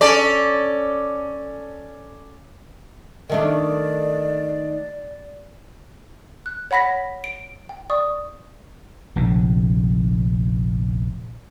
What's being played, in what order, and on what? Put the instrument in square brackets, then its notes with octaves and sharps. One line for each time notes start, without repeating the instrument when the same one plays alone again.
[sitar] C#4 A4 D5
[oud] D#3 A3 D4 [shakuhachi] D5
[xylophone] F#6
C#5 F#5 B5 A#6 B6
D7
G5
D5 C#6 D#6
[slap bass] F1 A#1 D3